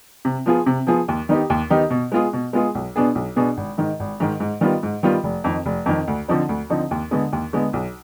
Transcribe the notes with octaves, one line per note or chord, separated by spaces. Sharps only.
C3
F3 B3 F4 G#4
C3
F3 B3 F4 G#4
D#2
D#3 B3 D#4 G4
D#2
D#3 B3 D#4 G4
B2
G#3 B3 F4 G#4
B2
G#3 B3 F4 G#4
B1
B2 B3 D4 G#4
B1
B2 B3 D4 G#4
G#1
G#2 D#3
G#1
G#2 D#3
G#2
D#3 G3 B3 F4
G#2
D#3 G3 B3 F4
F1
F2 D#3
F1
F2 D#3
D2
D3 F3 C4 D#4
D2
D3 F3 C4 D#4
D#2
D3 G#3 B3
D#2
D3 G#3 B3
B1